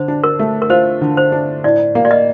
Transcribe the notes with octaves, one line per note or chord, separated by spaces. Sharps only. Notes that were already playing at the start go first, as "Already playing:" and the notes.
Already playing: D3 C5
D4
A#4
A3
A#4
F4 C5
D3
C5
D4
A2 D5
A#3
D5
D#5